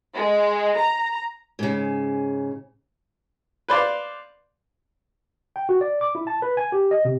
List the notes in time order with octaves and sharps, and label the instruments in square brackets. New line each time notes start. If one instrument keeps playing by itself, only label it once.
[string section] G#3
A#5
[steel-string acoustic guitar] G#2 C#3
[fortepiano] B4 C5 D5 F5
[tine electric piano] G5
F#4
D5
D6
E4
A5
B4
G#5
G4
D#5
C3